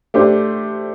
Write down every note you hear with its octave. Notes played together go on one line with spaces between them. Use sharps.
A3 D4 G4 C5